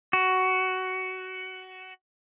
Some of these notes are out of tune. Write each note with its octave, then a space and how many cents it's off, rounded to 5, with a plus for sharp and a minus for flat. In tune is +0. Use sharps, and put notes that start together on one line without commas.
F#4 +15